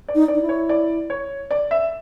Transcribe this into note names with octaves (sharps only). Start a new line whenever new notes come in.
D5
D#4
D5
D#4
E4
C#5
D5
C#5
D5
E5